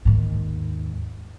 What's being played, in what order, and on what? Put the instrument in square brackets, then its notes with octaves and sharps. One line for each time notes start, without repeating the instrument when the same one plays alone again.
[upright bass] D#2 G#2